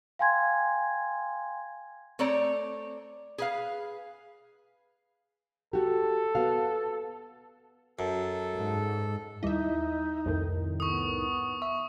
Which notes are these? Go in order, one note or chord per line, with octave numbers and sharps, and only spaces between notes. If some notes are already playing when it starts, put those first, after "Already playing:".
F5 G5 G#5 C6 G#6
A3 C4 C#5 D5 A#5
G#4 B4 F5
F#4 G4 A4
B3 F#4 F5
F#2 A4
G#2
D#2 G3 D#4 E4 D#5 E5
C2 F2 A2 D#3
B3 C#6 D#6
E5 C#6